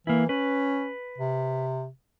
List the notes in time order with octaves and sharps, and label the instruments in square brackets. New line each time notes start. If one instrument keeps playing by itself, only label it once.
[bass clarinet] E3 [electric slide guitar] A#3 E4
[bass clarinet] C#4 [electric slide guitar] B4
[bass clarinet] C3